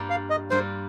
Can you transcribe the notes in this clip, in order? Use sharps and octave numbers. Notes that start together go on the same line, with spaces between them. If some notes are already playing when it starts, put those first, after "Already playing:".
Already playing: G2 G3 A#3 F4
F5
D#5
G2 G3 A#3 F4 C5